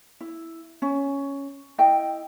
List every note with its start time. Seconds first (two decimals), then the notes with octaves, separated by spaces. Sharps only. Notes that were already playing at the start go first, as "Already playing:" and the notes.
0.21 E4
0.82 C#4
1.78 E4 D#5 G5